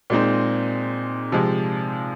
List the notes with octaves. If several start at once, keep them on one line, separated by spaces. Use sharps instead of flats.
A#2 G#3 C4 D#4
C3 F3 G#3